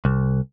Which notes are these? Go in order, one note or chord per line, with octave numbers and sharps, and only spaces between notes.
C2